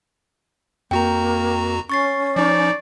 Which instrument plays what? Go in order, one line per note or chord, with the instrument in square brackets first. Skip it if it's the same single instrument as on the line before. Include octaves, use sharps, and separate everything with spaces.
[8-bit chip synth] F2 F#4 A#5 [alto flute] A#3 [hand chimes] G5
[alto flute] C#4 [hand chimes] C#6 A6 C7
[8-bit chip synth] F3 D#4 [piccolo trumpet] D5